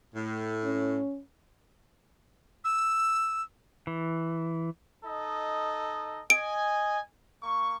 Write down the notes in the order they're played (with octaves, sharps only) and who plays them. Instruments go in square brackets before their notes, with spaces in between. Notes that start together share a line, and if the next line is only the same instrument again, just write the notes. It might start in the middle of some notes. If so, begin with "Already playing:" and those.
[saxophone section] A2
[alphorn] C#4
[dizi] E6
[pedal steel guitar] E3
[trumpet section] D#4 A4 D#5
[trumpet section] D#5 G#5 [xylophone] D7
[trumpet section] A#3 C#6